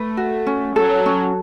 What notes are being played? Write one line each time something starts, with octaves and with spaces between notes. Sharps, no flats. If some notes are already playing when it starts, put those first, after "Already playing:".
Already playing: A3 B4
F#4
C#4
F#3 A4
C#4